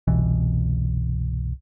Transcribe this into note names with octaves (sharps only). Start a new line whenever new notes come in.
G1 C2 B2 E3